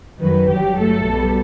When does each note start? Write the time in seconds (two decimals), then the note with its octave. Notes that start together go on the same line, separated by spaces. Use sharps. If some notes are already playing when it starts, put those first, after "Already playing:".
0.19 F#2 D#3 F#3 B4
0.48 G1 G2 F#3 G4
0.78 G1 G2 F#3 A3 A4
1.06 B1 B2 G3